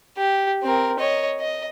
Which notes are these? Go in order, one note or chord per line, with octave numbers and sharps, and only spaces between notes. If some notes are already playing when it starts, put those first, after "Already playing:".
G4
C4 A#4
C#5 D#5
D#5